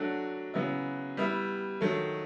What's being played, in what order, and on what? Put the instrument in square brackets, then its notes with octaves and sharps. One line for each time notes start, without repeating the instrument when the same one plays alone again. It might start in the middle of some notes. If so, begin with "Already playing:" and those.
Already playing: [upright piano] F#3 A3 D4 F#4
C#3 F#3 B3 E4
G3 B3 E4
D#3 F#3 A3